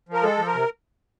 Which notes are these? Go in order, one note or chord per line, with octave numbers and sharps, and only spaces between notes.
F3 A#4
G#3 A4
F3
A#4
C3